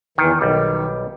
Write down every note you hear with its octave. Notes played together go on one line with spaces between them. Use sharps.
E2 D#3 E3
B1 D#3 G3